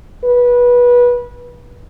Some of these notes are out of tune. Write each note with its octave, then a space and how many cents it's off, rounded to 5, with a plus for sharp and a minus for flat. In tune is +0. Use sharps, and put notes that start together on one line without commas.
B4 -20